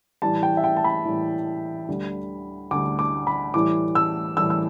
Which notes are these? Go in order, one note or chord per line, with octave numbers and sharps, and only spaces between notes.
A2 E3 G3 A5
G5
E5
G5
A5
B5
A2 E3 G3
D2 D3 G3
D2 D3 G3 D6
D6
B5
A2 E3 G3 D6
E6
A2 E3 G3 E6
E6